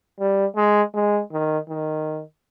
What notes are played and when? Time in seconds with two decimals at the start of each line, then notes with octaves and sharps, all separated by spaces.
0.20 G3
0.56 G#3
0.95 G#3
1.32 D#3
1.69 D#3